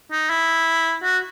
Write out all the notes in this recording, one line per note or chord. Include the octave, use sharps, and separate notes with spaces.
D#4
E4
F#4